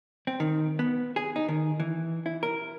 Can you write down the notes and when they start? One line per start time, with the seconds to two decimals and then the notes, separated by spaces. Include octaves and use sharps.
0.27 C4
0.40 D#3
0.79 B3
1.16 G#4
1.36 D#4
1.48 D#3
1.80 E3
2.26 E4
2.43 A#4